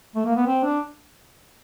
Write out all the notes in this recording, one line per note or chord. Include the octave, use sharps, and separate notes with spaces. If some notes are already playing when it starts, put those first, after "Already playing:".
A3
A#3
B3
C4
D4